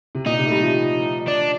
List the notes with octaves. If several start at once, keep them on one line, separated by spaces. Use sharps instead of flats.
C3
A#2 D#4
C3
A3
G3
F3
D4